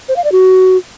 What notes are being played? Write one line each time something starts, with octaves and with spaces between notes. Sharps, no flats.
C5
F5
D5
F#4